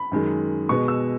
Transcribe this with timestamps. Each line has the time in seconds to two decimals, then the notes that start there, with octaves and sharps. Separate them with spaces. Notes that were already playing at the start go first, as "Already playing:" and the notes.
Already playing: B5
0.12 F#2 D#3 G#3
0.69 B2 G#3 B3 C#6
0.88 E6